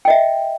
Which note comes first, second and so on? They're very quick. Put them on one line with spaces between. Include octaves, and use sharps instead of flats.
G5 D#5 E5